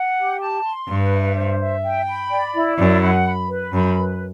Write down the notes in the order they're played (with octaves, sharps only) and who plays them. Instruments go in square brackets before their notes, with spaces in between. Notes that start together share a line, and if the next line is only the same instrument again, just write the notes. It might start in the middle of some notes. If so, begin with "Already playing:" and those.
Already playing: [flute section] F#5
G4
A5
C6
[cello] G2 [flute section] B4
[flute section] E5
C5
E5
G5
B5
D5
E4
[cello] F#2 [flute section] D5
[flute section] F#5
B5
B4
[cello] F#2 [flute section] B5
[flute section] B4